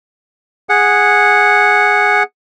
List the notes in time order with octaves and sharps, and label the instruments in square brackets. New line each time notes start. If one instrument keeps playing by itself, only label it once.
[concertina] G#4 F#5